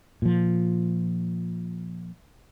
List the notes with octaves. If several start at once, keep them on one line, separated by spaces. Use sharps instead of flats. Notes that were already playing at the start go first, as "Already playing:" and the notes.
A#2 F3